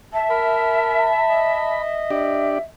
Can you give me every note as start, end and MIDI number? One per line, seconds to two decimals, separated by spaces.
0.13 2.10 76
0.13 1.73 81
0.30 1.09 70
0.30 1.82 83
1.30 2.70 75
2.11 2.58 62
2.11 2.58 67
2.11 2.58 74
2.11 2.59 76